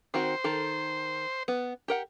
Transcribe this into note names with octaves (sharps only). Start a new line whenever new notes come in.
D#3 C4 F#4 C5
D#3 A4
B3
G4 A#4 F#5